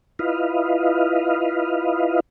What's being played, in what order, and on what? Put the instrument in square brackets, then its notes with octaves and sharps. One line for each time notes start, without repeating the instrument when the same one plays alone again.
[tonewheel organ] E4 F4 B4 D#5 F5